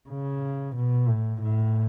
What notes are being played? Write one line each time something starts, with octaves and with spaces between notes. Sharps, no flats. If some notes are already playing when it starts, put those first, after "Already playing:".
C#3
B2
A2
A2